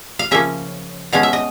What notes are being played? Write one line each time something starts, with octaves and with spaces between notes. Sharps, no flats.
F5
C#3 F3 A#3 C#4 E5
B2 G#3 C#4 F5
E5
D#5